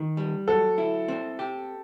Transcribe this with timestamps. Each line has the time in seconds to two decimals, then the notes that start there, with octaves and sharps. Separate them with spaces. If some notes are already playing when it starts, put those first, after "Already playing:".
Already playing: D#3
0.17 G3
0.47 F#3 A4
0.78 E4
1.08 C4
1.39 G4